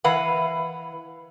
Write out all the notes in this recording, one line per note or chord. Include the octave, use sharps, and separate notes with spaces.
E3 B4 F5 F#5